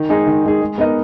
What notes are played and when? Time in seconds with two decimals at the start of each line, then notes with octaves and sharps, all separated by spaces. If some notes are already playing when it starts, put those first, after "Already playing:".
Already playing: D#3
0.09 G#3 D#4 G#4
0.26 D#3
0.43 G#3 D#4 G#4
0.61 G#3
0.78 B3 D#4 A#4 D#5